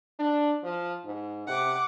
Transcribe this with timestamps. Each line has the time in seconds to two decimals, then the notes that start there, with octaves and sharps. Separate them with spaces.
0.19 D4
0.63 F3
1.05 G#2
1.48 C3 F#5 D6